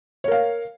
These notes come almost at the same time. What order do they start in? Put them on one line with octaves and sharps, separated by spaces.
C#5 A#4 F5